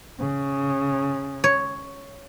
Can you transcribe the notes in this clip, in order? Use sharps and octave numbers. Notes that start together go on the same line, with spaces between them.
C#3
C#5